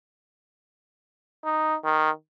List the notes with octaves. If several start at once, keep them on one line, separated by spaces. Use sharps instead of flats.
D#4
D#3